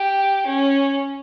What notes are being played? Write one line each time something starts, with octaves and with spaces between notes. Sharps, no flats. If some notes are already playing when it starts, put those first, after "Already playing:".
Already playing: G4
C#4